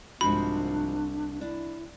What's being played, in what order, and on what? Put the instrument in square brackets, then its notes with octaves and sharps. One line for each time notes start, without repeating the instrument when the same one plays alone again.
[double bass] C2 [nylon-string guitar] G#2 F3 F#4 [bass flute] D4 [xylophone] B5
[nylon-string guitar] D4 [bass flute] E4